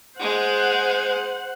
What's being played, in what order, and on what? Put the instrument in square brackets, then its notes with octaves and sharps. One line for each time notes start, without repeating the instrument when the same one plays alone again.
[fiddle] G#3 [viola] C5 F#5